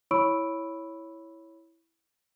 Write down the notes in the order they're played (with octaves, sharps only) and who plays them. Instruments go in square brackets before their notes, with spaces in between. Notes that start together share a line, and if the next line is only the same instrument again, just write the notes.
[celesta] E4 C#5 B5 C#6 E6 D7